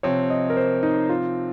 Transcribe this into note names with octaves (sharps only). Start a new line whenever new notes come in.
C3 F3 C4 C#5
D#5
A#4
C5
D#4
F4